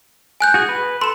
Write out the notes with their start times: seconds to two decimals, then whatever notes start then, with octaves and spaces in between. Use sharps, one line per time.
0.40 G#5 F#6 G6
0.54 F#4 G#4
0.69 B4
1.01 A4 C6 E7